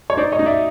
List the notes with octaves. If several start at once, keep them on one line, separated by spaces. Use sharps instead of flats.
C#5
D#4 C5 D5
C#5 D#5
D#4
D5 E5